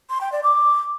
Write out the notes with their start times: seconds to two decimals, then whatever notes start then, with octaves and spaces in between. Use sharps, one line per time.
0.10 C6
0.21 G5
0.32 D5
0.43 D6